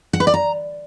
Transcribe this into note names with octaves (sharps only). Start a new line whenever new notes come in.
F#5
B4
D5
A#5